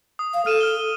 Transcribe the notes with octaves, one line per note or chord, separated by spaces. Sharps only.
D#6
F5
A4 F6 D#7 E7
F6 G7